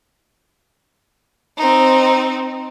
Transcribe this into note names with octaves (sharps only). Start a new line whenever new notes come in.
C4 D#4